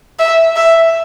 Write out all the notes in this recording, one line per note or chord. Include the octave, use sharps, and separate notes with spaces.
E5
E5